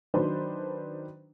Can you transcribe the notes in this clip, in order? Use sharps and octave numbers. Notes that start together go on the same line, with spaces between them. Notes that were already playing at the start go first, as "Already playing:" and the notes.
D#3 F#3 D4 D#4 B4 C5